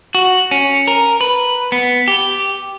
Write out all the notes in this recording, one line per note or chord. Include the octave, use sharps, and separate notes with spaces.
F#4
C#4
A#4
B4
B3
G4